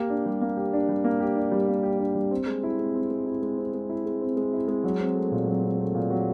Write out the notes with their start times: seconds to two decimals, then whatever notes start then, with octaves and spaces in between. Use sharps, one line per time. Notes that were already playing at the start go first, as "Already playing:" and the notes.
Already playing: A#3 G4
0.10 D4
0.26 G3
0.41 A#3
0.57 G4
0.73 D4
0.89 G3
1.04 A#3
1.20 G4
1.36 D4
1.52 G3
1.68 A#3
1.83 G4
1.99 D4
2.15 G3
2.31 C4
2.46 G#3
2.63 E4
2.79 G#3
2.94 C4
3.11 G#3
3.26 E4
3.42 G#3
3.57 C4
3.74 G#3
3.89 E4
4.06 G#3
4.21 C4
4.37 G#3
4.53 E4
4.68 G#3
4.84 F#3
5.00 C4
5.15 A3
5.31 A#2
5.47 F#3
5.63 C4
5.78 A3
5.94 A#2
6.10 F#3